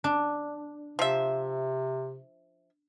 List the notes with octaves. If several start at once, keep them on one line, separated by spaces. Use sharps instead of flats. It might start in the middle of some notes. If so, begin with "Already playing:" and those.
D4
C3 F3 E5